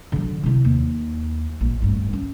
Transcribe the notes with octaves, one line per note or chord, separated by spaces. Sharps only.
D3 F#3
C3 E4
D#2
A#1
D1 G2
C#4